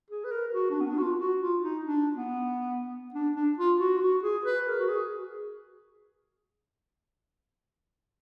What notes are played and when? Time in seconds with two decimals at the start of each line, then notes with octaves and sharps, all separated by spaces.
0.10 G#4
0.24 B4
0.31 A#4
0.54 F#4
0.70 D4
0.80 B3
0.87 D4
0.98 F#4
1.03 F4
1.20 F#4
1.41 F4
1.62 D#4
1.85 D4
2.16 B3
3.14 D4
3.36 D4
3.57 F4
3.79 F#4
3.97 F4
4.01 F#4
4.23 G#4
4.45 B4
4.67 A#4
4.79 F#4
4.88 G#4